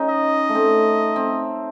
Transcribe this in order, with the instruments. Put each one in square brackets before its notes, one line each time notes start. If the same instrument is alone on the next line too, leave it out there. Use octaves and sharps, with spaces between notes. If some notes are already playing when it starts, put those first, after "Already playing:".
Already playing: [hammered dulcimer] C#4 D#4
[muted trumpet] D#5
[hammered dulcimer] A3
C4
C4